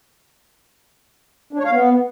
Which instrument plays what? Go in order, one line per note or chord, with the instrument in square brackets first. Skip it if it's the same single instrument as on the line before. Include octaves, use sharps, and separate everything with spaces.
[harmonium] D4
C#5
F5
B3